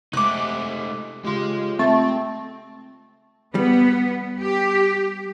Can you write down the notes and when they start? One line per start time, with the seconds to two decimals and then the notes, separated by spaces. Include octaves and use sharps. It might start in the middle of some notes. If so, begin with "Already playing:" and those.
0.13 C3 G#3 A3 D#4 D6 F#6
1.24 C#3 G#3 F4 G4 C6
1.79 A3 C4
3.55 G3 B3
4.39 G4